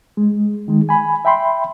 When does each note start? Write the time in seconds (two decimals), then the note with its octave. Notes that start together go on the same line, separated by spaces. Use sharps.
0.17 G#3
0.66 C#2 D#3 G#3
0.89 G#5 B5
1.25 E5 G5 B5 C6